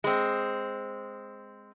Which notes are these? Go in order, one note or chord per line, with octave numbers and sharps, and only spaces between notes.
G#3 C4